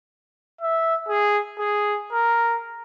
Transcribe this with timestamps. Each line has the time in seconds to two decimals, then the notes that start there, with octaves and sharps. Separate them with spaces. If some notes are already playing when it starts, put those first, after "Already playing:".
0.61 E5
1.09 G#4
1.59 G#4
2.12 A#4